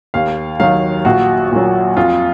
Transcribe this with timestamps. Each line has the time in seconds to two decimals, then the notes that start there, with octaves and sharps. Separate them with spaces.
0.14 D#2 F5
0.60 D#3 F#3 F5
1.05 A#1 F#4
1.52 A#2 F#3
1.96 F2 F4